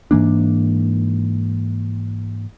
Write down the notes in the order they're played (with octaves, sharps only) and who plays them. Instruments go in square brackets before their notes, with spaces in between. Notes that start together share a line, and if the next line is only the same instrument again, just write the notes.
[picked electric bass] G#2 E3 A#3 D4